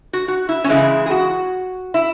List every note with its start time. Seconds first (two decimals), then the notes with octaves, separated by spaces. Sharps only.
0.13 F#4
0.28 F#4
0.49 E4
0.64 C#4
0.69 C#3 E3 G#3 E4
1.06 G#4
1.11 F#4
1.94 E4